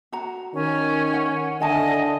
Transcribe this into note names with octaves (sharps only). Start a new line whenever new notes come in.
F#4 A#5
D#3 C#4
F#5
D3 E4 D#5 G#5 A5